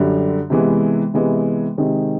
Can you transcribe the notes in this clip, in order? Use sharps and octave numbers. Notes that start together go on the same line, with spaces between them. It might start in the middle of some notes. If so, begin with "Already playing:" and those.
Already playing: F#2 D3 G3
C3 E3 G#3 B3
C3 E3 G#3 B3
C3 D#3 G#3 C4